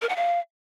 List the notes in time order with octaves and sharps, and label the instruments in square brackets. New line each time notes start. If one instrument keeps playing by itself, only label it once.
[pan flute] A#4
F#5
F5